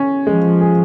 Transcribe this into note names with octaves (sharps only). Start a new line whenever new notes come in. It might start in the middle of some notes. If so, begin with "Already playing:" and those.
Already playing: C#4
F3 G#3
G#4